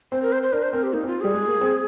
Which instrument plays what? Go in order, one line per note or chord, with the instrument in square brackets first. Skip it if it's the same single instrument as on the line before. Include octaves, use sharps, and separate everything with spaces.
[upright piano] C4 [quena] C5
[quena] A#4
C5
C5
[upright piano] D4 [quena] A#4
[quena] C5
[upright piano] C4 [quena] A#4
[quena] G4
[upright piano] A#3 [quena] D#4
[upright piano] C4
[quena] F4
[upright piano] G3 [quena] G#4
[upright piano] G#3
A#3
C4